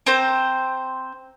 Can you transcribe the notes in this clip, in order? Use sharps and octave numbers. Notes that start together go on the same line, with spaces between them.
C4 C5 A#5